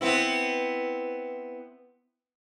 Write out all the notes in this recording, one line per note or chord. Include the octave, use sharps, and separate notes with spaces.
B3 C4 E4